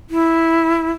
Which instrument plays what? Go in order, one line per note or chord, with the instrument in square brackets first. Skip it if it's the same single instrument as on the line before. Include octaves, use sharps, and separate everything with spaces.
[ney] E4